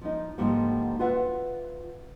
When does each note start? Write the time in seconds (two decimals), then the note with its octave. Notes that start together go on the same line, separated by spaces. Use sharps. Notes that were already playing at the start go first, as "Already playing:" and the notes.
0.01 F3 D#4
0.38 G#2 D3 F3 G3 A#3
0.99 F4 B4 E5 F#5